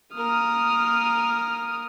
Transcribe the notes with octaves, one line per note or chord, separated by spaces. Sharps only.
A#3 A#4 D#6 F6